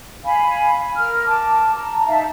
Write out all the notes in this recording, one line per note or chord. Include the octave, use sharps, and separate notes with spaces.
F5 G#5 B5
A#4 F6
A5 D6
A5 A#5
D#4 E5 F5 A5